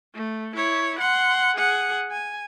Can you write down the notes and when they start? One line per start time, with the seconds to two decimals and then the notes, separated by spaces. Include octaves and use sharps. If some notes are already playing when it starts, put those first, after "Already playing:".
0.14 A3
0.56 E4 C#5
0.99 F#5 C6
1.56 G#4 F#5
2.12 G#5